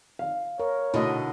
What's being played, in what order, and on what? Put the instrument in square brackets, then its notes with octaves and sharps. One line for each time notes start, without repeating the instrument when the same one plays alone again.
[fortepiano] F5
[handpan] A#4 [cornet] C#5
[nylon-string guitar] B2 D3 A3 [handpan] E4 F#4 D#5